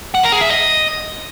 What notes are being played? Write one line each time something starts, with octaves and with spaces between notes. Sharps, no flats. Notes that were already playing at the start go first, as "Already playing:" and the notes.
F#5
A#4
G#4
E5
D#5